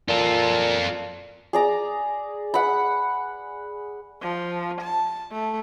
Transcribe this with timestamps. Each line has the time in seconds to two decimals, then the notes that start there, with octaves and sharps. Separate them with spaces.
0.09 A#2 F4 A4
1.53 G#4 D5 A#5
2.54 F#5 B5
4.22 F3
4.80 A5
5.32 A3